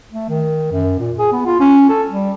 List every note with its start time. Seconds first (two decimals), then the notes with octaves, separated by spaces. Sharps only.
0.12 A3
0.29 D#3
0.72 F#2
0.99 A#2
1.18 G#4
1.32 B3
1.46 F4
1.60 C#4
1.89 A4
2.09 G3